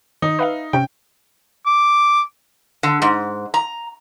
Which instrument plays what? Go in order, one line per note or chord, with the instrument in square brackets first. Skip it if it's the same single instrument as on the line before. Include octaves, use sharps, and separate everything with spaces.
[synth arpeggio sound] D#3 [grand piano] D#4
[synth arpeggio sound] B4 E5 F5
[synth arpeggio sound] C3 C#4 [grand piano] G5
[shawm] D6
[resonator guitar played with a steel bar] D3
G#2
A#5